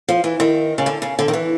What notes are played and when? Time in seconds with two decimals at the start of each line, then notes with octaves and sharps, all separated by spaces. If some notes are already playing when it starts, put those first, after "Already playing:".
0.09 F3
0.24 E3
0.40 D#3
0.78 C#3
0.86 D3
1.02 C#3
1.19 D3
1.28 D#3
1.33 E3